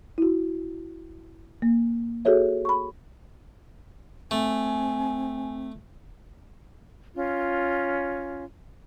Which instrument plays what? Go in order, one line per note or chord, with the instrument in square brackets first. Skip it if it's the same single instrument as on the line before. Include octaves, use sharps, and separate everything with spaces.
[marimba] E4 F#4
A#3
F#4 G#4 A4 C#5 E5
B5 C#6
[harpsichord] A3 [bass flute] C4 [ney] G#5
[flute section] C#4 F4